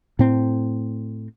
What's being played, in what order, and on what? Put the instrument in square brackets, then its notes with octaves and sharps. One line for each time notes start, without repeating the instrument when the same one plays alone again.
[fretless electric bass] A2 C4